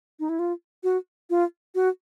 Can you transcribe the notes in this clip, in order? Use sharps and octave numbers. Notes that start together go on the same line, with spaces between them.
D#4
E4
F4
F#4
F4
F#4